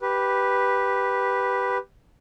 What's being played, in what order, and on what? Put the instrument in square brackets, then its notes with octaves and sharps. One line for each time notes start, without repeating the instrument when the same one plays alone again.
[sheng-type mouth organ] G4 B4